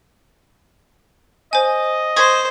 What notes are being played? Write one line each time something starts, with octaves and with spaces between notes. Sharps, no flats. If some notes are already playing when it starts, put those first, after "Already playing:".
C5 D#5 G#5
C5 C#6 D#6 G#6